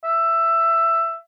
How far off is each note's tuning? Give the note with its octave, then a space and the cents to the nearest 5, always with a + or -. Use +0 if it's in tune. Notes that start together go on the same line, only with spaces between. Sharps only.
E5 +10